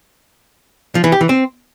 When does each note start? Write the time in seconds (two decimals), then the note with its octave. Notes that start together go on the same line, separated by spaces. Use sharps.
0.95 F3
1.04 E3
1.12 G4
1.21 E3
1.29 C4